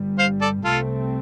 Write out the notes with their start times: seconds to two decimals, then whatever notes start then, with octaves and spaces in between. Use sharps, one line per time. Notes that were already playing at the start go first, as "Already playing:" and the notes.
Already playing: G1 G2 G3
0.18 C5 F5
0.41 A4 D5
0.64 C2 C3 A3 C4 F4 A4